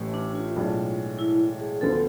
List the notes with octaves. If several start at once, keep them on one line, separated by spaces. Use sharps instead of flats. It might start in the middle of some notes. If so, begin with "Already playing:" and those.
Already playing: A1 A2 E3 A3
D4
F4
B1 A2 G#3 D4 A4
E4
G#4
D2 D3 F3 B3 A4